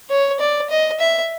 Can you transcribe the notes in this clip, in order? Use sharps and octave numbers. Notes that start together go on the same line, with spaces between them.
C#5
D5
D#5
E5